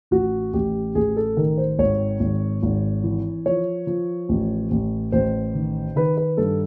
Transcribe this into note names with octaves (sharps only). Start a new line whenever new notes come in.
A1 F#4
A1 G4
A1 G#4
A4
D#3 A#4
C5
G#1 C#5
G#1
G#1
E3
F3 C#5
F3
A1
A1
A1 C5
D#3
D#3 B4
B4
G2 A4